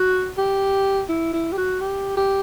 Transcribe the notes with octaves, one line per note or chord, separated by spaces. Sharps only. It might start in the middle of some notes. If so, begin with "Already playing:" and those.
Already playing: F#4
G4
E4
E4
G4
F#4
G4
G4